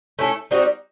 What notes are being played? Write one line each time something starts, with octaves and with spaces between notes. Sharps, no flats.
A3 C#4 E4 A4
G3 C4 D#4 F#4